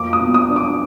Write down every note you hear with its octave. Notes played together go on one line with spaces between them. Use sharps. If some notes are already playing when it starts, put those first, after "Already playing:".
Already playing: F2 A#3 D6
D#6
B2
D#6
D4
D6